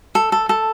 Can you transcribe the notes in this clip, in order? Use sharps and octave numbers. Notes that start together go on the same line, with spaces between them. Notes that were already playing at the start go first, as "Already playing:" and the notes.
A4
A4
A4